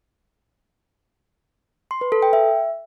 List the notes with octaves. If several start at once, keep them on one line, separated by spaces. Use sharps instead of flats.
C6
B4
A4
G5
E5